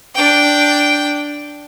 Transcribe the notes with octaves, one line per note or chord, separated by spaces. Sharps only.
D4 G5